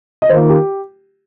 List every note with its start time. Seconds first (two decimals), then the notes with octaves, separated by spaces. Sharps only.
0.22 D#5
0.29 D#3 A#3 F4 C5
0.49 G4